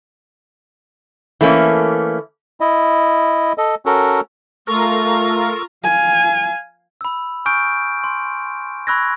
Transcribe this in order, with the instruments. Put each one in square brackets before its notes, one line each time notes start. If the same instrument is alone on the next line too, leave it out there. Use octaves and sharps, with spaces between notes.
[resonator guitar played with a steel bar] E3 A3 A#3 C#4
[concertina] E4 D#5
A4 D#5
C#4 F#4 A4 A#4
[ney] A3 [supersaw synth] F4 A#5 [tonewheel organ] A4 A#4 [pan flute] C#6
[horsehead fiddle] F5 G#5
[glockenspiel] B5 E6
G#5 C#6 D#6 F6 G6 D7
C6
B5 C#6 E6 F#6 G#6 A#6